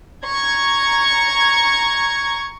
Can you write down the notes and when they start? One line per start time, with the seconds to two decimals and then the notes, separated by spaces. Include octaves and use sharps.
0.25 A#5 C#6 G#6